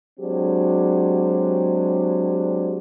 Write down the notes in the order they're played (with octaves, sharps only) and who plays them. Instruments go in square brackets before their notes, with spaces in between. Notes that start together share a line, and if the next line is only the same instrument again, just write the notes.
[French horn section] F#3 G#3 C4 D4 G4